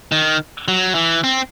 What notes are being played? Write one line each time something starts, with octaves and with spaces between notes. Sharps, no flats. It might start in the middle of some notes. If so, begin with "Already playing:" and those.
D#3
F#3
E3
C4